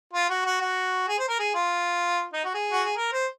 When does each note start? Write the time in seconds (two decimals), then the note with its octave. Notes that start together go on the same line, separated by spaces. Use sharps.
0.13 F4
0.30 F#4
0.46 F#4
0.61 F#4
1.08 G#4
1.19 C5
1.29 A#4
1.39 G#4
1.55 F4
2.33 D#4
2.45 F#4
2.54 G#4
2.72 F#4
2.84 G#4
2.97 A#4
3.13 C5